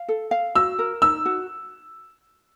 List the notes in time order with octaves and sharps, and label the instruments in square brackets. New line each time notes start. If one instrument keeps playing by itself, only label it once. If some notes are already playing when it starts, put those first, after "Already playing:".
Already playing: [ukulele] F5
A4
F5
[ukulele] F#4 [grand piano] E6
[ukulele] A#4
[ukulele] D#4 [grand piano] E6
[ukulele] F#4